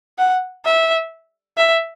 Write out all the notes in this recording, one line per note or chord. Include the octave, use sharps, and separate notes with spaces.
F#5
E5
E5